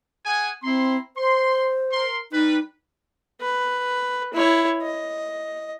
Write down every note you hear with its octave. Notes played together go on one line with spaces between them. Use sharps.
G#4 F#5 G#5
C4 E4 A#5 C6
C5 C6
A#4 C6
G3 D#4 B4
B4
E4 C#5
D#5